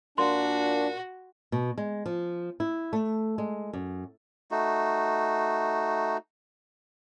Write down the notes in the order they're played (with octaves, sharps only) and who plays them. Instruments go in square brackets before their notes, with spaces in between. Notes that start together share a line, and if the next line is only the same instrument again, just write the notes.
[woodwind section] A#2 [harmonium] D4 [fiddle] F#4 [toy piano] C6
[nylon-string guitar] B2
G#3
F3
E4
A3
G#3
F#2
[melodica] A3 D#4 F#4